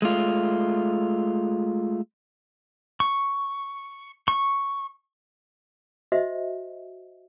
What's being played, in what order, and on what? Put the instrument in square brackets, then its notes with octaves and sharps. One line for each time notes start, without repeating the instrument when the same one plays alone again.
[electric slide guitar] G#3 A3 F4
[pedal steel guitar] C#6
C#6
[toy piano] F#4 C5 D#5 E5